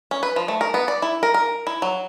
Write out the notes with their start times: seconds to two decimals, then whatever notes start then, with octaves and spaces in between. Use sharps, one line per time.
0.11 C#4
0.23 B4
0.36 F3
0.48 A3
0.61 A#4
0.74 B3
0.88 D5
1.02 E4
1.23 A#4
1.34 A#4
1.67 E4
1.82 F#3